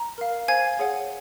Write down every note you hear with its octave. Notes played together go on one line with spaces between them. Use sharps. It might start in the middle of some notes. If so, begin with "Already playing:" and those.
Already playing: A#5
A#4 F5
C5 F5 G#5 G#6
G#4 C#5 F#5